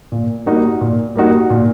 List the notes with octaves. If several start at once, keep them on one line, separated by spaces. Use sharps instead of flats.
A#2
G3 A#3 D#4 F#4
A#2
G3 A#3 D#4 F#4
A#2